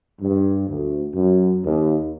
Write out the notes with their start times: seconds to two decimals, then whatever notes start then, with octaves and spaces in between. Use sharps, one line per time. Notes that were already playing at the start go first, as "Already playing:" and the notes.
0.21 G2
0.69 D2
1.14 F#2
1.65 D#2